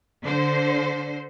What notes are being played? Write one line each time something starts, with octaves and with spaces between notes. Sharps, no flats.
D3 C5